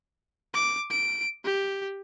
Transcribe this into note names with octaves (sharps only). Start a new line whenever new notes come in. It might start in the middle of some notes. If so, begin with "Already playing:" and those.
D6
D7
G4